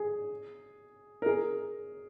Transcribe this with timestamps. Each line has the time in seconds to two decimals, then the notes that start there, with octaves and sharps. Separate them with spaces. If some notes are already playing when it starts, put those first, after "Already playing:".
Already playing: G#4
1.22 A#4
1.26 G#4